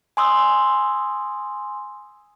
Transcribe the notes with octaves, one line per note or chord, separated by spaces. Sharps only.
G#5 C6 D#6 E6